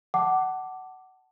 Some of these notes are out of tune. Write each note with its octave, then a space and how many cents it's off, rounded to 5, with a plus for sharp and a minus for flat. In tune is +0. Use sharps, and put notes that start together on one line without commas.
F#5 +20 A5 +0 D6 +0